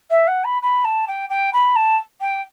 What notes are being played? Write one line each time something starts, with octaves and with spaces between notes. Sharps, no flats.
E5
F#5
B5
B5
A5
G5
G5
B5
A5
G5